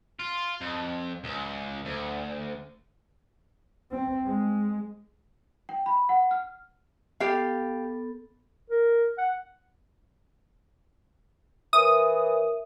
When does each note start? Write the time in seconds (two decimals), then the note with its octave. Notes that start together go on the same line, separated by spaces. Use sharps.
0.20 F4
0.61 F2
1.24 C#2
1.85 D2
3.92 C4
4.26 G#3
5.69 G5
5.86 B5
6.09 F#5
6.31 F6
7.20 B3 G4 A4 F5
8.70 A#4
9.18 F#5
11.73 E3 A#4 C#5 E5 D#6